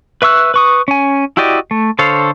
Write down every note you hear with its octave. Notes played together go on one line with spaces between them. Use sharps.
B4 E5 C#6 E6 F#6
B4 C#6 D#6
C#4 G#5
E4 F#4 G4 D5 D#5
A3
D3 A4 C5 C#5 F5